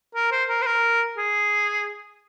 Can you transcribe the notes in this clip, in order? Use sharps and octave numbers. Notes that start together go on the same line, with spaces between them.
A#4
C5
A#4
C5
A#4
G#4